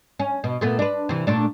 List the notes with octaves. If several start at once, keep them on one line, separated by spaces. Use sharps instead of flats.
C#4
B2
A#2 A3 B3
D4 B4
C3 E3
A#2 A3 D4